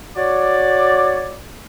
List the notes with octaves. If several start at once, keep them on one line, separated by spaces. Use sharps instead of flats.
F#4 C#5 D5